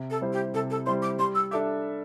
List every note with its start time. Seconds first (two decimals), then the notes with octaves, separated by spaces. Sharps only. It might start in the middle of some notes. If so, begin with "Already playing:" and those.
Already playing: C3
0.10 A4
0.21 G3 E4 C5
0.32 G4
0.54 C3 A4
0.70 A4
0.86 G3 E4 C5 C6
1.02 D6
1.19 G3 C6
1.34 E6
1.51 D4 A4 E5 D6